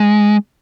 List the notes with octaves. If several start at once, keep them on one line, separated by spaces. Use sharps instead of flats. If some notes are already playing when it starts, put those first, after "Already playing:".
Already playing: G#3